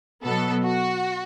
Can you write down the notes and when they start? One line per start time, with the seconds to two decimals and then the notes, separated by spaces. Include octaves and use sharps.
0.25 B2 F#3 B3 A4
0.64 F#4